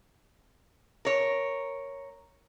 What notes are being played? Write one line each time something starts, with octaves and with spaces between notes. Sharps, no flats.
A#4 C#5